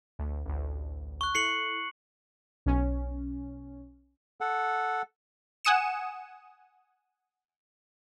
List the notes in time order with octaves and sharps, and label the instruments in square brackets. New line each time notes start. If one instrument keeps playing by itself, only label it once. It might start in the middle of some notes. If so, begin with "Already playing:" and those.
[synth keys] D2 A3
A1 D2
[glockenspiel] C#6 F#6
[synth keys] E4 A4 [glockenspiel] C7 C#7 F#7
[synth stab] B1 C#4
[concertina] A4 F#5
[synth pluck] F#5 G#5 D#6 C#7 E7